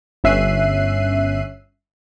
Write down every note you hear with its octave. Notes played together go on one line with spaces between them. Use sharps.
G1 C#4 E5 F#6 C7 D#7